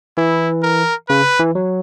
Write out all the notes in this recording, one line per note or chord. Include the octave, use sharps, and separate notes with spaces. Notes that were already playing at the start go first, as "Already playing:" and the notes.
E3 E4
A#4
C#3 B4
E3
F#3